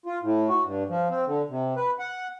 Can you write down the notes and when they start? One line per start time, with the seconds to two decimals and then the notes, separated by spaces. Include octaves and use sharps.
0.06 F4
0.23 A2
0.49 F#4
0.64 G2
0.89 F3
1.10 C4
1.27 D3
1.49 C3
1.76 B4
1.99 F#5